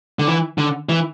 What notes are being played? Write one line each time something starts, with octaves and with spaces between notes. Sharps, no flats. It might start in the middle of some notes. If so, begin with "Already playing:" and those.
D3
E3
D3
E3